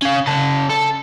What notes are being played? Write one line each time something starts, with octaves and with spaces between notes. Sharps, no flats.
C#4 F5
C#3 A5
A4